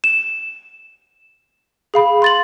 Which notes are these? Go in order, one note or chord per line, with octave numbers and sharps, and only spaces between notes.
E7
G#4 F5 B5
C6 A6 F#7